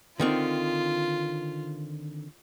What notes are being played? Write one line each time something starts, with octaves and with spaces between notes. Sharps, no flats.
D3 D#3 C4 F4